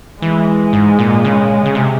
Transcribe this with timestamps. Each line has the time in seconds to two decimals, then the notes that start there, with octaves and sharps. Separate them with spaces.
0.22 E3 G#3
0.73 G#2
0.99 A#2
1.25 C#3
1.65 C#3
1.75 C3